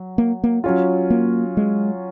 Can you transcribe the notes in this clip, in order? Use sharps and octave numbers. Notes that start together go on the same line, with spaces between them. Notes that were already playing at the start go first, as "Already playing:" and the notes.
Already playing: F#3
A#3
A#3
F#3 C#4 F4
A#3
G#3